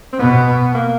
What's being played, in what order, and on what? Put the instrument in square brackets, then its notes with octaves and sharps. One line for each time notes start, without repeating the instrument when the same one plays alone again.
[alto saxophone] C4
[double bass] B2 [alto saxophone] B3
[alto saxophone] A#3